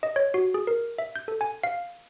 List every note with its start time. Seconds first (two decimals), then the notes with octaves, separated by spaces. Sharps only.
0.03 D#5
0.16 C#5
0.34 F#4
0.54 G#4
0.67 A#4
0.99 E5
1.16 G6
1.28 A4
1.41 G#5
1.64 F5